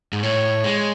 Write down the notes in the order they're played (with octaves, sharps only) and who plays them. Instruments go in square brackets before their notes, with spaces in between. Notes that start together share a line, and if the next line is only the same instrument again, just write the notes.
[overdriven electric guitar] G#2
[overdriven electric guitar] A2 [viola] C#5
[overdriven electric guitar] G#3